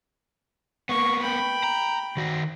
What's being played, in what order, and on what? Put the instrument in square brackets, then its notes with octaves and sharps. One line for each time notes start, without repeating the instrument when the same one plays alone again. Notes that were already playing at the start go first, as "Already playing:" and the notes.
[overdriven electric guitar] A#3 B3 [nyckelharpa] C#6
[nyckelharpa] G5 B5
[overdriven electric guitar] A#5
D#3 F#4